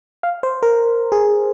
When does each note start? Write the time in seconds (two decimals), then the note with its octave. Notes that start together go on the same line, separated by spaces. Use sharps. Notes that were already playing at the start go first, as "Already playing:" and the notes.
0.23 F5
0.43 C5
0.63 A#4
1.12 G#4